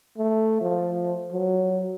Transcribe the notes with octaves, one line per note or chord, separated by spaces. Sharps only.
A3
F3
F#3